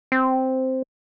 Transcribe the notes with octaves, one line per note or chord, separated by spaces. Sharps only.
C4